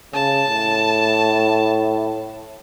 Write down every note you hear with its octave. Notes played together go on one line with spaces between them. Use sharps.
C#3 A5
A2